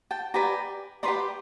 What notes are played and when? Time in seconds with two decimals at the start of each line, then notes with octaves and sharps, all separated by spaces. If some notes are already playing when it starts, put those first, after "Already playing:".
0.11 G5 A5
0.34 G4 B4 D5 G#5 A#5
1.03 G4 B4 D5 A#5 C6